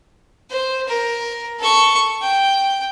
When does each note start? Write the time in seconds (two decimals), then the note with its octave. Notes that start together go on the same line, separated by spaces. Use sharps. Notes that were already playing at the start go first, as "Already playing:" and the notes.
0.50 C5
0.88 A#4
1.59 A4 C#6
2.21 G5